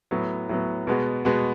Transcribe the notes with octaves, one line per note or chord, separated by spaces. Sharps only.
A2 F#3 B3
A2 F#3 B3
B2 G#3 B3 F#4
B2 G#3 B3 F#4